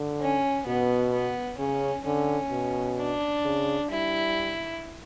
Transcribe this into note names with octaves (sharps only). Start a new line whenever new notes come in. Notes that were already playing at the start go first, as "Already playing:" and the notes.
Already playing: D3
C#4
B2 B3
B3
C#3 C#4
D3 C#4
B2
D4
C#3
G3 E4